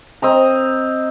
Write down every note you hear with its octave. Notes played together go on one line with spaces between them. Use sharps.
C4 D#5 A#5